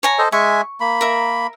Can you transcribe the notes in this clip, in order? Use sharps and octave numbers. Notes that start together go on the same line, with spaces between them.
C#5 G#5 A#5
A4 C5 D#5
G#3 E5 G#5 C#6
A#3 B5
A#4 E5